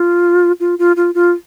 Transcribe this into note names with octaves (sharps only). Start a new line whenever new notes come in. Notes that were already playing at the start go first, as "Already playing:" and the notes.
Already playing: F4
F4
F4
F4
F4